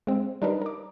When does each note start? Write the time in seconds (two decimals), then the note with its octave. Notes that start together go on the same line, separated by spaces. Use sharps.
0.07 G#3 C4
0.42 G3 D4 D#4 A#4 B4
0.62 A#4 D6